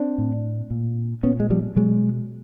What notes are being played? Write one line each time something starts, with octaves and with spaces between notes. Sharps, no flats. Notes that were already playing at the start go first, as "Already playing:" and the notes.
Already playing: C4 D4
A2
A#2
A#2 B3 C#4
G#3
F3 G3
B2 F#3 G#3